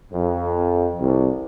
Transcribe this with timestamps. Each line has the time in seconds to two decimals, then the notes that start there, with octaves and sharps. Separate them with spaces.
0.11 F2
1.01 C2